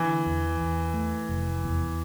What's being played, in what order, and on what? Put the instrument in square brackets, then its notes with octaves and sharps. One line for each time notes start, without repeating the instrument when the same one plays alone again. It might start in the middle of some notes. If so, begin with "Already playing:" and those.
Already playing: [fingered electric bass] D3 [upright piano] E3
[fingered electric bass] E2
E2
A3
F1
E2